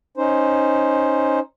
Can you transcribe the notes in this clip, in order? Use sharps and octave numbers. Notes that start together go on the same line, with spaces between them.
C#4 D#4 C5